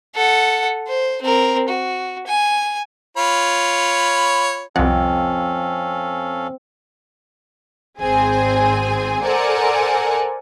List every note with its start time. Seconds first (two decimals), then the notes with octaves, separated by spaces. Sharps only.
0.16 A4 F#5
0.88 C5
1.22 C4 A#4
1.69 F#4
2.27 G#5
3.17 F4 C#5 B5
4.76 C2 F2 C4 C#4 A4 F5 F#5
8.00 G#1 C4 G#4 G#5
9.23 A4 A#4 C5 D5 F#5 G#5